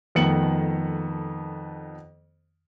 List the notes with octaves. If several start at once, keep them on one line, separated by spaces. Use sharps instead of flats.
F2 D#3 A3 B3 C#7 F#7